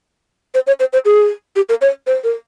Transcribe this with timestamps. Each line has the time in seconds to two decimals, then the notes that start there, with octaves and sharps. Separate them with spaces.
0.54 C5
0.67 C#5
0.79 C5
0.93 C5
1.05 G#4
1.56 G4
1.69 A#4
1.81 C#5
2.06 C5
2.23 A#4